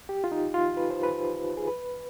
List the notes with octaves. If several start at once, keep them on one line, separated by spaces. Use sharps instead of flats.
G4
F4
D#4
F4
B4
C5
B4
G#4
B4